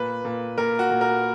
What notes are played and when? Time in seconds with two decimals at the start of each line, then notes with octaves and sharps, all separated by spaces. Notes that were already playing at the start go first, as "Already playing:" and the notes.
Already playing: A#2 B4
0.25 A#2
0.58 A#2 A#4
0.79 F#4
0.90 A#2
1.01 A#4